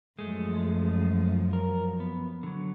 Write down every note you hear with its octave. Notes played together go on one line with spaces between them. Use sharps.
F#2 F3 G#3 A3
A#4
B3
D3 F#3